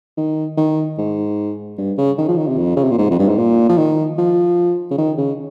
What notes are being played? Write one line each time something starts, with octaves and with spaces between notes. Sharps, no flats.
D#3
D#3
G#2
G2
C#3
D#3
F3
D#3
C3
F2
C#3
C3
A#2
G#2
F2
G2
G#2
A#2
F3
D#3
F3
C#3
D#3
C#3